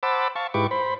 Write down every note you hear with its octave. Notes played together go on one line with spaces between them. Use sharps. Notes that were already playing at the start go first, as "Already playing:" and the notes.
C5 F#5 A5 B5 D6 E6
F5 A5 C#6
G#2 E4 G4 B4 C#6 D6
C5 B5